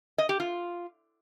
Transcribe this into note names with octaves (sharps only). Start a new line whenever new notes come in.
D#5
G4
F4